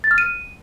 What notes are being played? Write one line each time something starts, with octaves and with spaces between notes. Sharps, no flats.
A6
F6
D#7